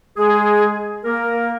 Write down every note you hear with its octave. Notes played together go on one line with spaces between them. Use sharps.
G#3 G#4
A#3 A#4